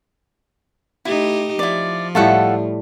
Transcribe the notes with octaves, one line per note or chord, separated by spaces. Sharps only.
A3 D#4 E4 G4
F3 E4 D5
A2 G3 A3 F4 A4 F#5